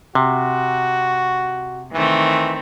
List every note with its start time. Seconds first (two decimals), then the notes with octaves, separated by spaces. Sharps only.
0.15 C3 F#4
1.93 D#3 E3 A3 C4